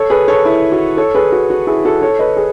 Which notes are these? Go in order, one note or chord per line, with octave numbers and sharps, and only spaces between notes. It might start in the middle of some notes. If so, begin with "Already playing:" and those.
Already playing: A4 C#5
G#4 B4
A4 C#5
E4
F#4
A4 C#5
G#4 B4
F#4
F#4
E4 G#4
F#4 A4
A4 C#5
B4 D#5
G#4